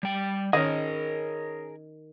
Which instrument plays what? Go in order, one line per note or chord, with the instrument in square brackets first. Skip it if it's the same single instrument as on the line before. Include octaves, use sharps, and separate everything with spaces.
[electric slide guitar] G3 G5
[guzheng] D#3 [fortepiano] C#4 D#5 [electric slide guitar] G#4 A#4